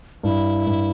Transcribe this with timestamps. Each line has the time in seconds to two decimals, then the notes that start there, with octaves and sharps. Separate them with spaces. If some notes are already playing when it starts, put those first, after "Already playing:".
0.23 G2 E4
0.67 G2